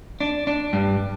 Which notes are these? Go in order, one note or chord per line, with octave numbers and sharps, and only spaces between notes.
D4
D4
G2